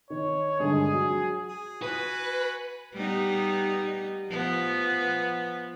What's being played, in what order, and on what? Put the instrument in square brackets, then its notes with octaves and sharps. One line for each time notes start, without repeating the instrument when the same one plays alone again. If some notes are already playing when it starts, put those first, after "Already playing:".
[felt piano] D#3 [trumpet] C#5
[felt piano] G2 D3 G#3 [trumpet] G#4
[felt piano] F#3
[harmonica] G#4
[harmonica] F#4 G#5 [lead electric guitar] B4
[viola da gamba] G3 B3 D#4
F3 B3